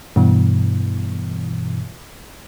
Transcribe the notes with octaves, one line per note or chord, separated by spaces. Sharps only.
G2 B2 E3